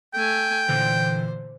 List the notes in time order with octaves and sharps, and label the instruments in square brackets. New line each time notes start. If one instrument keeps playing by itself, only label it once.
[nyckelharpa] A3 G#5 [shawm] G5
[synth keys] A#2 D3 E3 [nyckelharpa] C5